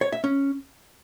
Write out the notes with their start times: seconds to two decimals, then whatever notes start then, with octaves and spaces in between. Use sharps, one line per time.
0.01 C#5
0.12 E5
0.24 C#4